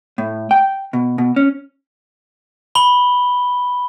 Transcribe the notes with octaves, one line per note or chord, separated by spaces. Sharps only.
A2
G5
B2
B2
C#4
B5 G7